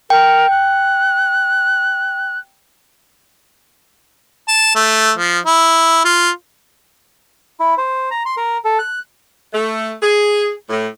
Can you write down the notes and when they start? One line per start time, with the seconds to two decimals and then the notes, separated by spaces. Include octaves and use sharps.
0.10 A#4 G5
0.50 F#6
4.48 A5
4.76 A3
5.18 F3
5.46 E4
6.05 F4
7.60 E4
7.78 C5
8.11 A#5
8.26 C6
8.37 A#4
8.65 A4
8.79 F#6
9.53 A3
10.01 G#4
10.69 A2